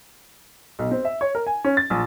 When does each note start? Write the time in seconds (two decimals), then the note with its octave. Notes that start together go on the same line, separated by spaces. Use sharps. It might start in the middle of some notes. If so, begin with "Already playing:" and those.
0.79 B1
0.91 C4
1.05 E5
1.21 C#5
1.35 A#4
1.47 G#5
1.64 C#4
1.77 A6
1.90 A#1